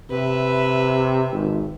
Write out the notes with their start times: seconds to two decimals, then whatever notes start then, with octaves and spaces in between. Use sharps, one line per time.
0.10 C3 B4 E5
1.32 G#1